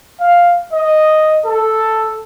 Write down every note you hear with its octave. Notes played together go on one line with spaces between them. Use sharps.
F5
D#5
A4